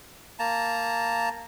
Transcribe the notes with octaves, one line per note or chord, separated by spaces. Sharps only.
A#3 A5 A#5